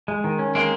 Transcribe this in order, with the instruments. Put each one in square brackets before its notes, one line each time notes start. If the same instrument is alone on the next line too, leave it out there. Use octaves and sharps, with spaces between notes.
[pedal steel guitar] G#3
D#3
C#4
[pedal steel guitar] G#3 [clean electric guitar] A#3 C4